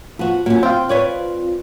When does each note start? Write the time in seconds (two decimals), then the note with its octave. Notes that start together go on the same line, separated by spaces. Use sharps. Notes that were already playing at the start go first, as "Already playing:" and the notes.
0.19 F3 B3 F#4
0.46 A#2 F#3 C#4
0.63 C4 F4 G5
0.89 B4 C#5 D5